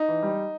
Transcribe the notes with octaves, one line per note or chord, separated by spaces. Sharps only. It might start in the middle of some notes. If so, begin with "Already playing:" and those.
Already playing: D#4
E3
G3